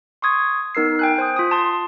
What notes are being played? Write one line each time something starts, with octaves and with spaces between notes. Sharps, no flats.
C6 C#6 D#6 G#6
B3 D#4 A#4 E6 C7
G5 G#5 F#6
C5 G#5 D#6
F4 D#6
A5 C6